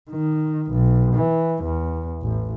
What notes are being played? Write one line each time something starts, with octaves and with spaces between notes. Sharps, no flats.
D#3
B1
E3
E2
A1